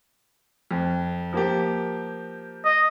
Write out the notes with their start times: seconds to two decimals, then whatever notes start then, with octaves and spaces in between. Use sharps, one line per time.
0.71 F2
1.33 F3 A#3 G4
2.65 D#5